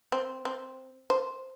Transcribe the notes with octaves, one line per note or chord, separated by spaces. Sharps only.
C4
C4
C5